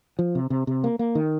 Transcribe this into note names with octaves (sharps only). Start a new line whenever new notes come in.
F3
C3
C3
C3
A#3
A#3
D#3